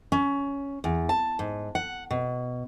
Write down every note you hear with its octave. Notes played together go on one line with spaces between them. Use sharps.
C#4
E2
A5
G#2
F#5
B2